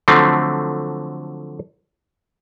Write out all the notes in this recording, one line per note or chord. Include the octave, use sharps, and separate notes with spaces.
D3 F3 F#3 A3 C4